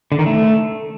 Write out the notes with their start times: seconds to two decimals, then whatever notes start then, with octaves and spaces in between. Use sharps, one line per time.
0.12 D3
0.19 D#3
0.26 A3